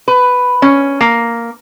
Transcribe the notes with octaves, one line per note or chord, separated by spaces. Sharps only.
B4
C#4
A#3